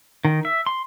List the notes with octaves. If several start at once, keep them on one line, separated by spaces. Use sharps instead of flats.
D#3
E5
C6